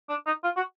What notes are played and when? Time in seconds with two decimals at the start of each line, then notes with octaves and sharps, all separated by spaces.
0.09 D4
0.26 D#4
0.44 F4
0.57 F#4